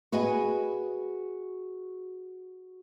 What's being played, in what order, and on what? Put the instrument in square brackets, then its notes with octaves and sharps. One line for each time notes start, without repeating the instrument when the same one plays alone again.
[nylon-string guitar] F#4 G#4 B4 D#5 G#5